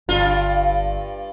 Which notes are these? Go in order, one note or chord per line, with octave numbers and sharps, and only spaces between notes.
G1 G2 F4